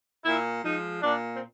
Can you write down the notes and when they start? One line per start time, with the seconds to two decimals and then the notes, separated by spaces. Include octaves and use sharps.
0.25 A#2 E4
0.64 F3 G#3 D#4
1.02 A#2 D4
1.35 C4